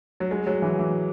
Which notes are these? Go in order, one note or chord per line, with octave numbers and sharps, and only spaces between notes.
F#3
G#3
F#3
E3
E3